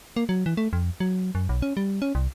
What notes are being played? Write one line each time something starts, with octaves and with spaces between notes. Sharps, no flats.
A#3
F#3
E3
A3
F2
F#3
F#2
B1
C#4
G3
C#4
C2